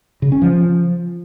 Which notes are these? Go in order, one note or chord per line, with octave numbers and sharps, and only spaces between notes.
C#3
C#4
F3